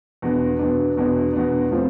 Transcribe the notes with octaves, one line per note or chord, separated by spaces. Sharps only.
E2 B2 B3 D4
E2 B2 B3 D4
E2 B2 B3 D4
E2 B2 B3 D4
A2 F3 C4